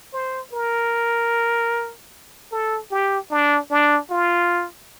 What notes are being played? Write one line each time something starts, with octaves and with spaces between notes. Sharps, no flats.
C5
A#4
A4
G4
D4
D4
F4